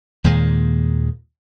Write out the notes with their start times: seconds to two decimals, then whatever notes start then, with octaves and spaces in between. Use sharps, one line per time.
0.24 D#2 A#2 D#3 G#3